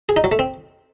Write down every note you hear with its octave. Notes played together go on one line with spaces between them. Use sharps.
G#4
D#4
F#3
A3
C4